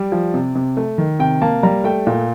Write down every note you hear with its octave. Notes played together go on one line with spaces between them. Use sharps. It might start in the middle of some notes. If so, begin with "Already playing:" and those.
Already playing: G3 D5
F3
C3
C3
A3
D#3
C3 G5
A#3 A5
G3 A#5
A3 G5
A#2